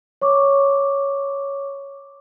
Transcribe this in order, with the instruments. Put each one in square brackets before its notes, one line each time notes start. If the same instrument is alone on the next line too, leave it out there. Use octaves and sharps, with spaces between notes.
[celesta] C#5 C#6 D6